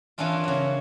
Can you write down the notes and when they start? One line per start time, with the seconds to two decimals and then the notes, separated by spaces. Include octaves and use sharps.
0.18 E3 A#3 C#4 D4 F4
0.44 C#3 F#3